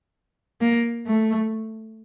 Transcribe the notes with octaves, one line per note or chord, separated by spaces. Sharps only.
A#3
A3